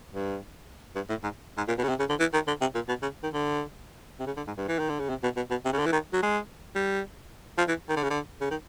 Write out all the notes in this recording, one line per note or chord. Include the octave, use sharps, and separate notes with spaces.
G2
G2
A2
G#2
G#2
A#2
B2
C#3
C3
C#3
D3
E3
D#3
D3
C3
A#2
B2
C#3
D#3
D3
C3
C#3
D3
G#2
G2
E3
D#3
D3
C#3
C3
B2
B2
B2
C3
C#3
D3
E3
D#3
F#3
G#3
G3
F3
E3
D#3
D3
C#3
D3
C#3
D#3